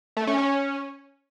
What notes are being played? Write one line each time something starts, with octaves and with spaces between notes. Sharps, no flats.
A3
C#4
C#4